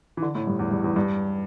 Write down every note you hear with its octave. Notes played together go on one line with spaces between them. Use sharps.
E3
D3
A2
G2
E2
G2
E2
G2